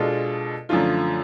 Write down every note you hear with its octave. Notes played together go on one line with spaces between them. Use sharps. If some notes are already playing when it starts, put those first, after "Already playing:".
Already playing: B2 G#3 D4 F4 A4
F#2 D3 F3 A3 F4